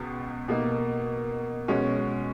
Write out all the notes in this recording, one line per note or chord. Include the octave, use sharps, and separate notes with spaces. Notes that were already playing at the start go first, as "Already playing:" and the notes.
Already playing: C#2 B2
B2 A#3 D#4
B2 G#3 C#4 F#4